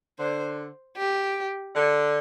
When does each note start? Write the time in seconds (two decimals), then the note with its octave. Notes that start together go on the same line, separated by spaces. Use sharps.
0.19 D3 C5
0.97 G4
1.75 D3